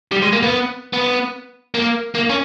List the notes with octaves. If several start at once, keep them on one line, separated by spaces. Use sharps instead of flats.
G3
G#3
A#3
B3
B3
A#3
A#3
C#4